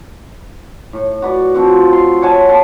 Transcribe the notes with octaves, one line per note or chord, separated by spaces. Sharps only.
A2
F#4 B4 D5
F3 C4 F#4
C6
C#5 F#5 G#5 A5
A4 F5 A5 C6